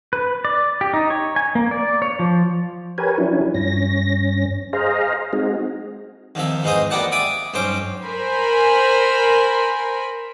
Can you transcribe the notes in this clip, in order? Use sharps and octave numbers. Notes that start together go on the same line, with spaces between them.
B4
D5
G4
D#4
C#5
G#5
A#3
D5
C#5
F3
G4 A#4 B4 C#5 G#5
F3 F#3 C#4 D4 E4
G2 C#4 A#6
G#4 C5 D#5 F5 A#5
G#3 C4 D#4 F#4 G#4
D#2 C3 F3 E5
G#2 E3 D#4 C5 D#6
A#3 B3 G4 D5 F#5 A5
D5 E5 G#5 D6 D#6
B1 G2 C#4 C5 D6
A#4 C5 G#5 B5